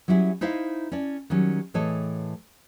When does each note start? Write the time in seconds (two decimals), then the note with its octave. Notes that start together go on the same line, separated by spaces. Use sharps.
0.08 F#3 G3 C#4 E4 F#4 G#4
0.41 D#4 E4 C5 D#5 F5
0.92 C#4 A4 D5
1.30 D#3 F#3 G3 C#4
1.74 A2 E3 G#4 A4 C#5 D#5